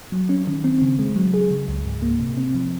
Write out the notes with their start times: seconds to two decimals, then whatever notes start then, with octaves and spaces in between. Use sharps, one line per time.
0.12 F#3
0.29 C#4
0.47 D#3
0.64 C4
0.82 C#3
0.99 G#3
1.16 F#3
1.34 G#4
1.51 C#3
1.68 C#2
1.85 G#2
2.02 A#3
2.20 C3
2.37 C4
2.55 F3